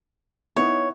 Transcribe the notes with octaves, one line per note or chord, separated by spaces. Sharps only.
B3 D#4 E4 C#5